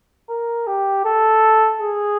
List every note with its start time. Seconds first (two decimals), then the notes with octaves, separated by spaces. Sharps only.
0.29 A#4
0.67 G4
1.05 A4
1.81 G#4